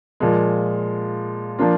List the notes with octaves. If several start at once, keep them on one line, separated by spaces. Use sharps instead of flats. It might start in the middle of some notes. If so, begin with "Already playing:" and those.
A#2 F3 G#3
F3 A#3 D4 F4